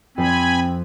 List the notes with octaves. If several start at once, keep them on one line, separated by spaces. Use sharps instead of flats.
F2 C4 C5 G#5 B5